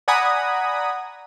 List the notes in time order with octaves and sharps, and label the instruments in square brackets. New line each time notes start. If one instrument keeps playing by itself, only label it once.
[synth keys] D5 F#5 G#5 A#5 B5 D#6